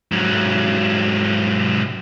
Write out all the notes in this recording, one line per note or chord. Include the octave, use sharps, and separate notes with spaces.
G#2 F#3